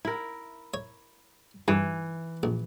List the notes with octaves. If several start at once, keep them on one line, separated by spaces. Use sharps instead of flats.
E4 A#4
C#5
G2 E3
A#1